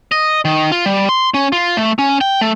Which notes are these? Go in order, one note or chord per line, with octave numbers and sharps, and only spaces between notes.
D#5
D#3
F4
G3
C6
C#4
F4
A3
C#4
G5
A3